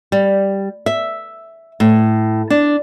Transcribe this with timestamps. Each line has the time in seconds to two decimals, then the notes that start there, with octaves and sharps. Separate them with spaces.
0.12 G3
0.86 E5
1.80 A2
2.50 D4